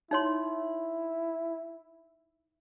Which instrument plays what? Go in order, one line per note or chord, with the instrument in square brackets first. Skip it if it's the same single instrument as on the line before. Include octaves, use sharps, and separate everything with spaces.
[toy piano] D#4 C#5 C6 [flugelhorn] E4